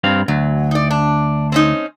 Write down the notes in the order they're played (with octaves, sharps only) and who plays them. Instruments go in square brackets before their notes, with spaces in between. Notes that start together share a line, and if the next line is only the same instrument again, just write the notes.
[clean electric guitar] G2 C4 F5
[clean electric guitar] D2 [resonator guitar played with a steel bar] F#3
[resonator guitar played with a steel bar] D#4 D5
D4
C4 C#4 D#4